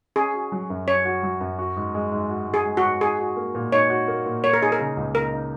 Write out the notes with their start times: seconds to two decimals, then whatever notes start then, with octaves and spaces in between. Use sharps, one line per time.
0.16 C#4 G#4
0.34 F#4
0.52 F#3
0.70 F#2
0.87 C#4 C#5
1.05 F#4
1.23 F#3
1.41 F#2
1.59 F#4
1.76 G#2
1.94 G#3
2.12 G#2
2.30 F#4
2.47 G#2
2.54 G#4
2.66 G#3
2.77 F#4
2.83 G#2
3.01 D#4 G#4
3.19 F#4
3.37 A#3
3.55 A#2
3.72 D#4 C#5
3.90 F#4
4.08 A#3
4.26 A#2
4.44 A#3 C#5
4.53 A#4
4.61 D#4 G#4
4.72 A#4
4.79 C#3
4.97 C#2
5.15 A#3 A#4
5.33 D#4